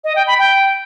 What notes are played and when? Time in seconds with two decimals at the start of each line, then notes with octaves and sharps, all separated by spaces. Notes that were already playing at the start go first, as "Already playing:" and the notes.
0.04 D#5
0.16 G5
0.27 B5
0.39 G5